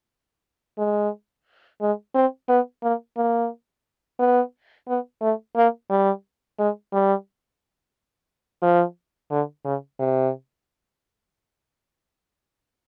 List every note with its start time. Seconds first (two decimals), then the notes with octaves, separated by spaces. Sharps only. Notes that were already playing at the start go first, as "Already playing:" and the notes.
0.78 G#3
1.81 G#3
2.15 C4
2.49 B3
2.83 A#3
3.17 A#3
4.19 B3
4.88 B3
5.22 A3
5.56 A#3
5.90 G3
6.59 G#3
6.93 G3
8.62 F3
9.31 D3
9.65 C#3
9.99 C3